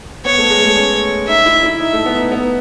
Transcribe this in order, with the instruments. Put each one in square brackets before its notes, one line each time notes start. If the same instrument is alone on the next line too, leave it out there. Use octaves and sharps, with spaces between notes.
[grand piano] B3 [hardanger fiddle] C#5
[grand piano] A3
G#3
A3
C#4
[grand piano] D#4 [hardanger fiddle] E5
[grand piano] E4
E4
[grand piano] D#4 [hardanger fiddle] E5
[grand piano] A3
B3
D#4
B3